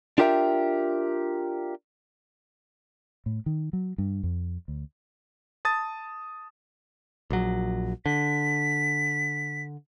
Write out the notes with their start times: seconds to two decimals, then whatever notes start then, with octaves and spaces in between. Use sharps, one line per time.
0.18 D4 F4 G4 A#4 E5 G5
3.26 A2
3.46 D#3
3.73 F#3
3.98 G2
4.23 F2
4.68 D2
5.65 A5 D#6 A6
7.30 A#1 F#3
8.06 D3 B6